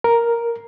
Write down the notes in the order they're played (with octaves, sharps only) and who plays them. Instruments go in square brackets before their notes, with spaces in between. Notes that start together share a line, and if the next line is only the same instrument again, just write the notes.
[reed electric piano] A#4